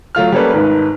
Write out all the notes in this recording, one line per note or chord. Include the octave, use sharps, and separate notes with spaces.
F#3 A3 F4 F6
G3 A#3 C#4 A4 B4
G#1 G#2 B4